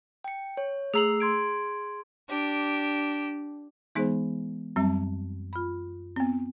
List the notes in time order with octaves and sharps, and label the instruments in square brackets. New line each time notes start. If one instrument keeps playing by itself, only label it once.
[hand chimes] G5 C#7
C#5
[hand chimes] A3 E6 C7 [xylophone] G#4 A#5 F#7
[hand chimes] C6 G#6 D7
[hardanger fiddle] D4 G4
[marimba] E3 G#3 B3 [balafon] D#4 G#4 C5
[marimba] F#2 A5 [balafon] F#3 G3 C4
[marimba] F4 B5
[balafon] B3 C4